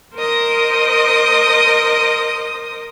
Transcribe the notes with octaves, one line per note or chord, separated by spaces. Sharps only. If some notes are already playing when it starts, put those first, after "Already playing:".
A#4 C5 D#5 D#6